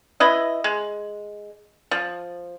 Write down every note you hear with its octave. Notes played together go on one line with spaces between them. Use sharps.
E4 B4 D#5
G#3
F3